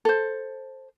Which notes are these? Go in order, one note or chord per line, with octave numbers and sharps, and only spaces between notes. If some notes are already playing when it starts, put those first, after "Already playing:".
A4 C5